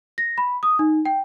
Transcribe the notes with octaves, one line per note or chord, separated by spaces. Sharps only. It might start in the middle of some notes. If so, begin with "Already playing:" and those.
A#6
B5
D#6
D#4
G5